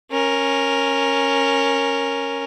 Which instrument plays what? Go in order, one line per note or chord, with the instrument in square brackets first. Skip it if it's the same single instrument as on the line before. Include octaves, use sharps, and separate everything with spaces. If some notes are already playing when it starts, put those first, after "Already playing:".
[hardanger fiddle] C#4 A#4